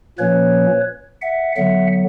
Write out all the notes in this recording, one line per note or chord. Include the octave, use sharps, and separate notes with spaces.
A#2 F3 A#3 C#4 B4 C#5
E5 F#5
D3 F#3 B3 E5 F#5